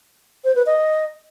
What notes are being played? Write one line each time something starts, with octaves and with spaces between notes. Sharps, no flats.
C5
B4
D#5